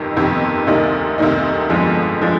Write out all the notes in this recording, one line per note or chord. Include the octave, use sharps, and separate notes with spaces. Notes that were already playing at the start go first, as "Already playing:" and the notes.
Already playing: G1 F2 C3 D#3
G1 F2 C3 D#3
D2 C3 D#3 A#3 D#4
D2 C3 D#3 A#3 D#4
G1 F2 D3 F3 G#3
D3 F3 G#3